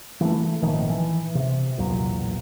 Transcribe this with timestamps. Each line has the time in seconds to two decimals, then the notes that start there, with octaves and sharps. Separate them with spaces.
0.21 E3 F#3 A3
0.61 G#1 A#2 D#3 F3
0.90 E3
1.35 C3
1.78 B1 E2 A#2 F#3